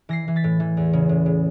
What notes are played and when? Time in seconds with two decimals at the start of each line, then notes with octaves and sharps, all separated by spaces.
0.09 E3 A#6 C7
0.28 E3
0.36 A6 B6
0.44 A2
0.60 E3
0.77 E2
0.93 C#3
1.09 A2
1.26 A2